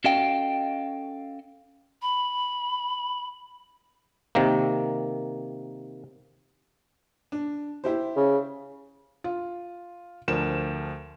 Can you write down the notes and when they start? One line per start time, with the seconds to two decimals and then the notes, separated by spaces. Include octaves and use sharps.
0.04 C#4 F#4 A4 D#5 F5 G5
2.02 B5
4.35 C3 D#3 A#3
7.32 D4
7.84 E4 G4 C5
8.16 C#3
9.24 F4
10.28 D2 F3 D4 A#4 E7